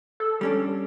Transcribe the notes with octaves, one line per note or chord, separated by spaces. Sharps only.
A4
G3 C#4 D4